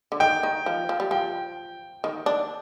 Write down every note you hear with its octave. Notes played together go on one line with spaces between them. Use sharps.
D3
D#3 G5
D#3
F3
F3
G3
F3 G5
D#3
D4